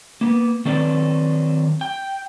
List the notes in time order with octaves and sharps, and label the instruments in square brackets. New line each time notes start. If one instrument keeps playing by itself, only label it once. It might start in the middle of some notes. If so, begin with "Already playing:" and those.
[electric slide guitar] A#3 B3
D#3 F#3 C4 A4 B4 D5
G5